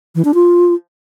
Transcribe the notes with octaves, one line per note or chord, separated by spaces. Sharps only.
E3
D4
F4